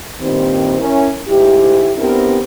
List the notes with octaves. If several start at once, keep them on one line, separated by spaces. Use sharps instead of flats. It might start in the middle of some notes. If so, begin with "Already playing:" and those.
G2 A#2 D#3 G3 C4
C#4 E4 A#4
D2 G#2 E4 G4
B3 C4 D4 E4 G4 A#4